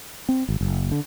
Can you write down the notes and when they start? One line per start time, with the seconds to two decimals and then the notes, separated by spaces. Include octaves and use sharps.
0.29 C4
0.49 G#1
0.61 F#1
0.92 D3